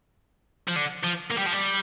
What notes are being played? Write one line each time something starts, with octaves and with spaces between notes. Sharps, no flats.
F3
D3
F3
A#3
G3
F3
G3